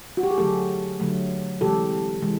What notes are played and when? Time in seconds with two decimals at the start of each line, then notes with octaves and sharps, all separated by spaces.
0.17 F#4
0.23 G4
0.31 G#4
0.38 D3 F#3 A3 G4 A4
1.00 D3 F#3 A3
1.61 C3 E3 G#3 G4 A4
2.22 C3 E3 G#3